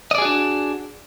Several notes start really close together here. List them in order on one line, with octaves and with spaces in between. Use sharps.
D#5 D5 G#4 F#4 D4